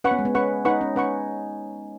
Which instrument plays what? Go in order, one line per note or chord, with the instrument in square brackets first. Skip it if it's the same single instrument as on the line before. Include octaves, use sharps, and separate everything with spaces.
[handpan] C#4 [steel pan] B4 F#5 C#6
[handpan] B3
G#3
B3
[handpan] C#4 [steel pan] B4 F#5 C#6
[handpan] D#4 [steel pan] B4 F#5 C#6
[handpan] C#4
[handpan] C#4 [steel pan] B4 F#5 C#6